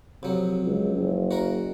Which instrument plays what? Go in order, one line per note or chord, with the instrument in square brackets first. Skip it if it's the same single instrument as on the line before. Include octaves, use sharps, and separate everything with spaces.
[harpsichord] F2 F#3 [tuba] C3
[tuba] C#2
F#1
[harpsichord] F#4 A#4